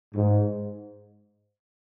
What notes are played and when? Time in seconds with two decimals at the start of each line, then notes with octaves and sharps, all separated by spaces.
0.15 G#2